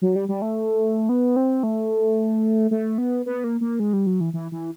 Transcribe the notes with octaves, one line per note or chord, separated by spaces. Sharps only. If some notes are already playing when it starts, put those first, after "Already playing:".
F#3
G3
G3
A3
B3
C4
A3
A3
B3
B3
A#3
A#3
G#3
G3
F#3
E3
E3
E3